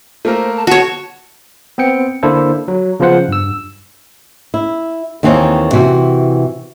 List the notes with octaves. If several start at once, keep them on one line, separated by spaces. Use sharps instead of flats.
A3 A#3 A#4 C5
A5
F#4 C#5 A5
B3 C4 G5 C#7
D3 A#3 D4 E4 A4 C5
F#3
C#3 F3 B3 F4 C5 F#5
G2 E6
E4
D#2 D#3 E3 C4 D#4 C#5
C3 E3 F#4